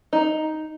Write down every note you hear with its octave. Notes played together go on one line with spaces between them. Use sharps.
D#4